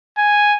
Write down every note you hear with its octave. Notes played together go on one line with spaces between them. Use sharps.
G#5